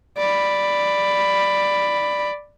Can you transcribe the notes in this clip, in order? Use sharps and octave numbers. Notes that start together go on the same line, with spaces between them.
D5 B5